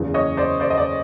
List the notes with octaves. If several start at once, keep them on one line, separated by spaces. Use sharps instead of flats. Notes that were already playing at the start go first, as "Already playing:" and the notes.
Already playing: F#1 E2 C#3 E3
C#5 D#5
C5 D5
C5 D5
D#5
C5 D5